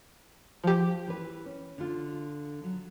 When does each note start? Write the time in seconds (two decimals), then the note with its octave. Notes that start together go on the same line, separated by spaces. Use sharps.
0.64 F3 G4
1.07 E3 B4
1.46 C#4
1.78 D3 F4
2.64 F#3